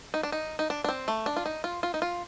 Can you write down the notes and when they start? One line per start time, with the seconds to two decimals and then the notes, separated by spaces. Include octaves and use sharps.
0.14 D#4
0.23 D4
0.32 D#4
0.59 D#4
0.70 D4
0.84 D4
0.89 C4
1.08 A3
1.26 D4
1.37 F4
1.46 D#4
1.64 F4
1.83 F4
1.94 D#4
2.02 F4